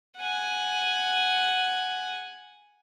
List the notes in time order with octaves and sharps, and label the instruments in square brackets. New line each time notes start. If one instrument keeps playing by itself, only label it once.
[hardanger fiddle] F#5 G#5